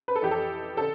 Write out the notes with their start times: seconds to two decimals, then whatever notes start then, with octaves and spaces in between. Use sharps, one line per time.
0.08 B4
0.16 A4
0.22 F2 E3 G4
0.31 A4
0.77 D3 A4